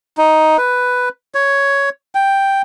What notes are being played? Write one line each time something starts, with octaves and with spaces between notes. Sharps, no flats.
D#4
B4
C#5
G5